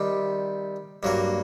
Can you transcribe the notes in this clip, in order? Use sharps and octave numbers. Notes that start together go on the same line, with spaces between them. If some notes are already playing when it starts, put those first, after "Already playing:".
Already playing: C3 D#3 G3
G2 F#3 A#3